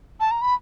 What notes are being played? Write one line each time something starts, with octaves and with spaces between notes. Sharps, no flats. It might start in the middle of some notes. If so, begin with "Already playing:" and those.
A5
A#5
B5